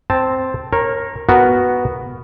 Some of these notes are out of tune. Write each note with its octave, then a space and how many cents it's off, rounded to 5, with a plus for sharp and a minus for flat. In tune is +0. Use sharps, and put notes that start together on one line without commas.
C4 +0 A5 +0
A#4 +0 C#5 -30
B3 +0 F#4 +0 A#4 +0